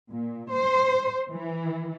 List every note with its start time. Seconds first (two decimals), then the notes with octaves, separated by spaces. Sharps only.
0.11 A#2
0.53 C5
1.31 E3